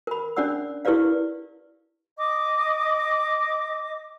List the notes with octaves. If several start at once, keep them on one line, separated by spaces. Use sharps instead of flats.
A#4 B5
C#4 D4 D5 F#5 E6
E4 G4 A#4 B4 D5 F5
D#5 D6